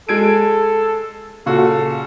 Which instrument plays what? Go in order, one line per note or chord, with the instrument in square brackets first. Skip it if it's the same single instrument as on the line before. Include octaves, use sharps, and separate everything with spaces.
[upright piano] G#3 G#6 D7 [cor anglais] A4
[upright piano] A#2 C#3 F#4 [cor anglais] A4